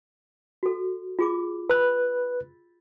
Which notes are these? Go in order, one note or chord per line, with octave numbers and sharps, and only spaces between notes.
F#4 A4
F4 G#4 D6
B4 B5 E6 F#6